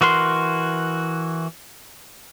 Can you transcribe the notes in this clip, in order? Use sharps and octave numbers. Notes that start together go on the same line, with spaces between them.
E3 F#4 A#4 C6